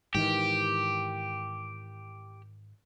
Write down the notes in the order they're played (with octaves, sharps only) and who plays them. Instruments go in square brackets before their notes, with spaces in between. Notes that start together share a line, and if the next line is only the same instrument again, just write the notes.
[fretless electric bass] G#2 D#3 E3 [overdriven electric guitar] G4